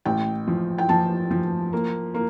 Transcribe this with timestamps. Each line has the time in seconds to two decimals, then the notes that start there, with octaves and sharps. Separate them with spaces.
0.05 A1 G5
0.47 F3
0.78 G5
0.89 F3 A5
1.31 F3
1.73 A#3
2.14 A#3